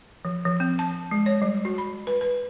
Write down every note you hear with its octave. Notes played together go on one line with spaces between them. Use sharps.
F3
F3
C4
A5
G#3
C#5
G3
F#4
B5
B4
B4